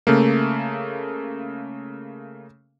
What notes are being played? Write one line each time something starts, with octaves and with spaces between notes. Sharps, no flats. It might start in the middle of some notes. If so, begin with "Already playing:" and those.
C#3 A3 A#3